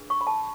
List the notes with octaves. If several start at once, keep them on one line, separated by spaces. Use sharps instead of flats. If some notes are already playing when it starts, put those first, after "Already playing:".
Already playing: D4 G#4 B4
C#6
B5
A5